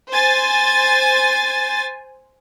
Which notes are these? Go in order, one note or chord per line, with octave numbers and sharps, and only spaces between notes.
C5 G#5 A6